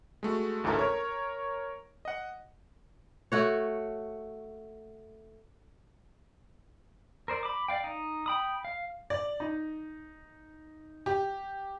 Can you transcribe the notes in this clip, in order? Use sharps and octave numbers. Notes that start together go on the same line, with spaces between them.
G#3 A3 F#4
A1 D2 G#2 E4 A4 A#4
A#4 C#5
D#5 F#5
A3 F#4 C#5
A#4 C5 D5
B5 D6
D5 F5 G5
D#4
G5 B5 D#6
F5
D5
D#4
G4